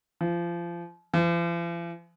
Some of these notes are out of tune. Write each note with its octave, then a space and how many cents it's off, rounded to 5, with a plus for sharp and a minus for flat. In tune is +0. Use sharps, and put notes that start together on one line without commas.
F3 -25
F3 -45